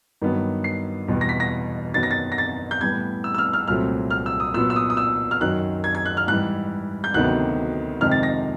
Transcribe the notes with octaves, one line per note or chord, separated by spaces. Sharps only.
G2 D#3 F#3 B3
C7
E2 B2 G3 B3
A#6
B6
A#6
F#2 D#3 F#3 B3 A6
A#6
A6
A#6
A6
G6
A2 E3 G3 B3 G#6
E6
E6
F6
F6
C2 A#2 F#3 A3 C4 F6
F6
E6
D#6
A#2 F#3 B3 E6
E6
D#6
D#6
E6
F6
F#2 D#3 F#3 F#6
G#6
G#6
F#6
F6
G#2 E3 G3 F#6
G6
D2 C3 D#3 F#3 B3 F#6
F2 C3 D#3 G#3 F6
A6
A#6